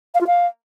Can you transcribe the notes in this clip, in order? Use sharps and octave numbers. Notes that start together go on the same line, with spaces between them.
F5
F4
F5